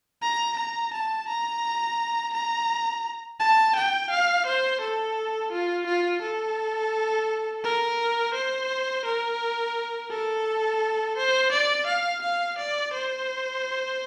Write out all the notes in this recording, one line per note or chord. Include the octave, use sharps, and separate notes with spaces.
A#5
A#5
A5
A#5
A#5
A5
G5
F5
C5
A4
F4
F4
A4
A#4
C5
A#4
A4
C5
D5
F5
F5
D5
C5